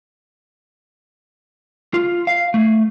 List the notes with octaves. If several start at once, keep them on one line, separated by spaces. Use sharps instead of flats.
F4
F5
A3